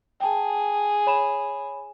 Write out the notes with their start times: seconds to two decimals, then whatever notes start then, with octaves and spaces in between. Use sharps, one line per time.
0.20 G#4 G5 A5
1.07 C#5 B5 E7